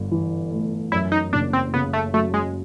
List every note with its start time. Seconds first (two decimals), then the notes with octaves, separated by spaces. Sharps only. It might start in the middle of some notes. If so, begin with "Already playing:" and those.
Already playing: G1 G2
0.11 E3
0.51 A3
0.92 F#2 E4
1.12 D#4
1.32 F#1 D4
1.53 C4
1.74 C#3 B3
1.93 A3
2.13 F#3 A3
2.34 G#3